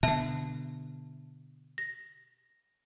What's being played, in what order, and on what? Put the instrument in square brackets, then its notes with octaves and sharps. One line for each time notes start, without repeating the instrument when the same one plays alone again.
[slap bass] B2 D3 [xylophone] E5 A5
[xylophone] A#6